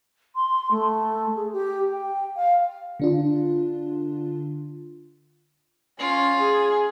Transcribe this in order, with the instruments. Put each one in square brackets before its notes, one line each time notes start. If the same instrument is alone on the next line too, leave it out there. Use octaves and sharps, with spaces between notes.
[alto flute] C6
A3
G#4
G4
G5
F5
[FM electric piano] D3 D4 F4
[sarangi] C#4 [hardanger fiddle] F4
[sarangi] G#4